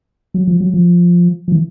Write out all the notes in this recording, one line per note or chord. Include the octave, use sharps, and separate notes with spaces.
F#3
F3
F#3
F3
F3
E3